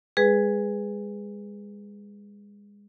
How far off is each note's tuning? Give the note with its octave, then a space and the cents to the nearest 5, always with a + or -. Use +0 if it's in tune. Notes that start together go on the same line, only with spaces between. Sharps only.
G#3 -30 G#4 +0 B4 +5